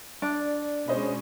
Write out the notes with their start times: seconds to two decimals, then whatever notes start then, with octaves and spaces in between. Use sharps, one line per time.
0.22 D4 D5
0.88 B2 G#3 C#4 C5 D#5 B5